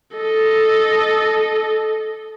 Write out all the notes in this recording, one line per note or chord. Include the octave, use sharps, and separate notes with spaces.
A4 D#5